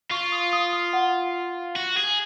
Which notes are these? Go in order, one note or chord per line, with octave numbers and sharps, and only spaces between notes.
F4 C#6
D#6
D#6
D#6
F#5
F#4
G#4